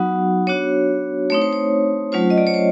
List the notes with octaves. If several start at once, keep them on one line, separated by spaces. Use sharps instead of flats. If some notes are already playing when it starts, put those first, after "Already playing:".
Already playing: F#3 B3 D#4 F#4 F#5
B3 D4 F#4 C#5
A3 C4 D#4 C#5
C5
C#5
F#3 A3 C#4 F4 C5
D#5
D5
C#5
C5